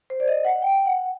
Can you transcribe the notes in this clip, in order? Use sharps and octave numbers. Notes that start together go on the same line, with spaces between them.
C5
D5
D#5
F#5
G5
F#5